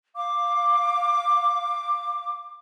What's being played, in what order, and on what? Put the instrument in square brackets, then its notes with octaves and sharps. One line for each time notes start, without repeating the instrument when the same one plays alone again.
[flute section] F5 D6